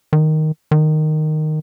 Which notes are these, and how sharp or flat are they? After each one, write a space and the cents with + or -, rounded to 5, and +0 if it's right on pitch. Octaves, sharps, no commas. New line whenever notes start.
D#3 +0
D#3 -10